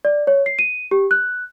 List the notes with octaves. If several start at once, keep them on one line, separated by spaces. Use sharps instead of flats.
D5
C#5
C7
D#7
G4
F#6